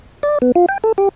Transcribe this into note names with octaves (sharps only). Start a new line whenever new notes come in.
D5
B3
F4
G5
A4
G4